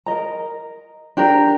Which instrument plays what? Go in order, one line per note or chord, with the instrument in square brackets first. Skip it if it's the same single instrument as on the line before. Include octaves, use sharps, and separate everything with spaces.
[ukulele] A#4 D#5 A#5
D4 G4 A#4